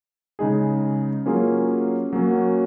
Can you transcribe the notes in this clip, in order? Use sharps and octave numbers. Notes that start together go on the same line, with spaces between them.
C#3 G#3 D#4 G#4
F#3 A#3 C#4 F4 G#4
F#3 A#3 C#4 F#4